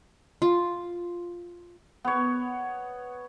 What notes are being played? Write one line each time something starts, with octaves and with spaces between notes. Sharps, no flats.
F4
B3 C#5